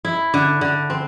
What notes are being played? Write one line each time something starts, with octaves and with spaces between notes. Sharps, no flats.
E4
D3
D3
C4